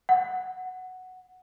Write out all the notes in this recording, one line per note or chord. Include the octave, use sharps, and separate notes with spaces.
F#5